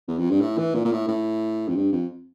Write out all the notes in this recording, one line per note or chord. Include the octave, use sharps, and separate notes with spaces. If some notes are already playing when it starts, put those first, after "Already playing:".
E2
F2
G2
A2
E3
A#2
A#2
A2
A2
F2
G2
F2